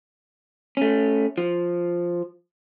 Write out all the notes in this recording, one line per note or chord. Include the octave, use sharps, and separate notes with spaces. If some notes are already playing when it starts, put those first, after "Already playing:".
A3 C#4
F3